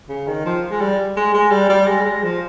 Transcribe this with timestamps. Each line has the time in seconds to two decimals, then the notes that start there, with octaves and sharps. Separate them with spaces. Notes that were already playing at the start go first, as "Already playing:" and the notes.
0.09 C#3
0.27 D#3
0.45 F3
0.71 G#3
0.81 G3
1.16 G#3
1.34 G#3
1.51 G3
1.69 G3
1.87 G#3
2.01 G3
2.05 G#3
2.23 F3